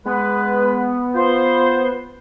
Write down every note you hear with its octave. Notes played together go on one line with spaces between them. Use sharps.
G#3 B3 B4
F4 C5